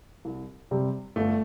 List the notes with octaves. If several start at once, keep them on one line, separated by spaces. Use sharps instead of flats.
C2
C3 G3
G1 A3